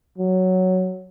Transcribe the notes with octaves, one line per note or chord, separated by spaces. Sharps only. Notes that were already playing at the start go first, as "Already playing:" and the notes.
F#3